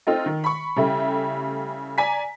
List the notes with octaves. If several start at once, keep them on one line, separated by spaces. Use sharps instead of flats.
A3 C4 D#4 F4
D#3
B5 C#6
C#3 G3 A3 E4
D5 G#5 A#5 B6